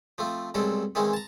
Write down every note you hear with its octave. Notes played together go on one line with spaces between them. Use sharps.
F3 A3 C4
C2 G#2 B2 F#3 C4 A4
D#3 E3 G#3 C4 C#4
A5 A#5